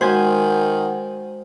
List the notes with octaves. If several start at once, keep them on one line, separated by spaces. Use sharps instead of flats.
D#3 G#3 F#4 C5 F#5 G#5